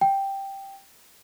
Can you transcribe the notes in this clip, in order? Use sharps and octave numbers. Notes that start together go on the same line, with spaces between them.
G5